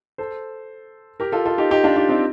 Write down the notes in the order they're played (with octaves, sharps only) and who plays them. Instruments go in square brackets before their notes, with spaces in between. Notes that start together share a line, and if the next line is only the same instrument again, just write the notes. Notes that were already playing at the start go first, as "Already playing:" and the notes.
[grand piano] A4 C5
G4 A#4
F4 A4
F4 A4
D#4 G4
D#4 G4
D4 F4
D#4 G4
C4 D#4